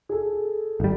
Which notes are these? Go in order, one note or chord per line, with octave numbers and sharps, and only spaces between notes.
G#4 A4
G#1 G3